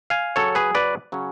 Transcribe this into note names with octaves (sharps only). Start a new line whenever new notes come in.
F5 G#5
C#3 F#3 C#4 A4 C#5
G#4 B4
B4 D5
C#3 F#3 C#4